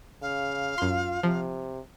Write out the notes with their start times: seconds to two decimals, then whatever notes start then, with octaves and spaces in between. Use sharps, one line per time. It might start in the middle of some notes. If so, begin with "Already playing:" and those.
0.22 C#3 F5
0.78 F#2 F4 C6
1.23 C3 F3